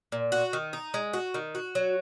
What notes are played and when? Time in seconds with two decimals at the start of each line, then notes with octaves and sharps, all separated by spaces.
0.12 A#2
0.32 F#4
0.53 D#3
0.73 D#4
0.94 G#3
1.13 F#4
1.34 D#3
1.55 F#4
1.75 F#3